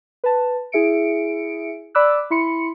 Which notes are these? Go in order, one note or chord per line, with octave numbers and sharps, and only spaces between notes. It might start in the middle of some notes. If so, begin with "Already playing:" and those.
B4 A5
E4 G#4 E5 C#7 D7
D5 B5 D6 E6 F#6
E4 B5 C6 C#7